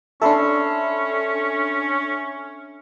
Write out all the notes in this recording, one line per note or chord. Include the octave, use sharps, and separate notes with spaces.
C#4 D4 A4 E5 B5 C6